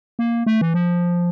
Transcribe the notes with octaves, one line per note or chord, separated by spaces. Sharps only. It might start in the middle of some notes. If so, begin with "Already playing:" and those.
A#3
A3
E3
F3